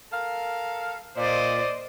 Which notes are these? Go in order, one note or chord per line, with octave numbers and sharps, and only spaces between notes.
A4 A#4 F5
A#2 C5 D5 D#5